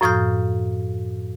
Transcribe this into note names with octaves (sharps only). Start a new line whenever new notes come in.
F#2 A2 F3 D#6 F6 G6